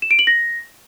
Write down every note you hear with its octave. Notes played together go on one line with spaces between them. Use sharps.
E7
D7
F#7
A#6